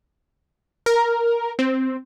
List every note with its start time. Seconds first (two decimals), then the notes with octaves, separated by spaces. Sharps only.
0.86 A#4
1.59 C4